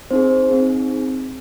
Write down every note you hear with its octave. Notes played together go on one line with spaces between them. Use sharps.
C4 D#4 G#4 C5
C4 D#4 G#4